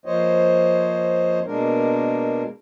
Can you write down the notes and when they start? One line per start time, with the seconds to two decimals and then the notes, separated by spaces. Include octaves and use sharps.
0.06 F3 A#3 C5 C#5 D#5
1.46 B2 G#3 A#3 D4 A#4